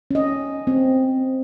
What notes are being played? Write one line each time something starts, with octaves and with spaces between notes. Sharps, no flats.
C#4 D#5
C4